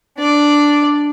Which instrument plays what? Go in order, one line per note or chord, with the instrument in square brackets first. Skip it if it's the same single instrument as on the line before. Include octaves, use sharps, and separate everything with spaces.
[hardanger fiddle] D4 D5